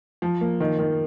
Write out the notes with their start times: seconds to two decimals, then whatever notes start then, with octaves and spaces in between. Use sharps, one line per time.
0.22 F3
0.41 A#3
0.60 D#3
0.79 D#3